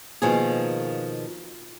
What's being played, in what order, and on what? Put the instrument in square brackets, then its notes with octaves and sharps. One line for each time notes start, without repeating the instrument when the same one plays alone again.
[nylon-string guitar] B2 D#3 F3 A#3 G#4